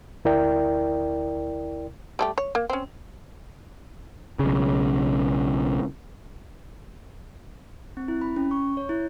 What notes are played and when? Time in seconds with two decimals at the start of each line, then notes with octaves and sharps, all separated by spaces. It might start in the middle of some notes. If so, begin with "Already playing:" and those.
0.25 D2 E4 A#4 D5 G5
2.19 G3 A3 G4
2.38 C#5
2.55 A#3
2.70 C4 C#4
4.39 B1 C#3
7.97 C4
8.08 E4
8.21 B5
8.36 C#4
8.51 C#6
8.77 C#5
8.89 E4